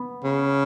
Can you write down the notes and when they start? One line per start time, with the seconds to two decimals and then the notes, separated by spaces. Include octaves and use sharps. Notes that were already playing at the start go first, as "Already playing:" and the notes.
Already playing: B3
0.24 C#3